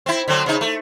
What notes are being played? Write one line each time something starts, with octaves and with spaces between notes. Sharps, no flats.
C4 E4
D3 F#3 C4
C#3 D#4
A3